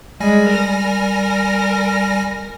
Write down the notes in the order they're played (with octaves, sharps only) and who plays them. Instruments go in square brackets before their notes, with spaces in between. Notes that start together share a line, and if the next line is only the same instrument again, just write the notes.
[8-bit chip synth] G3 G#5 A#6 [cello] G#3
[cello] A#4